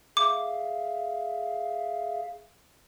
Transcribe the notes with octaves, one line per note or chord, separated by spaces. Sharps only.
G#4 E5 F5 D6